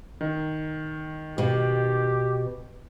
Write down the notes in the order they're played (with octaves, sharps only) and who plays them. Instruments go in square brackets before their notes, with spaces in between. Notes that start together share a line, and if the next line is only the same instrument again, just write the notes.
[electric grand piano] D#3
[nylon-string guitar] B2 [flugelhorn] G4